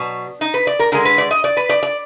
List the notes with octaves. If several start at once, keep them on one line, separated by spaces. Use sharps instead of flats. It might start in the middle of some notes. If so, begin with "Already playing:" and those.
Already playing: B2 F#3 D4
D#4
B4
D5
A#4
D3 G#3 A#4
B4
D5
D#5
D5
B4
D5
D5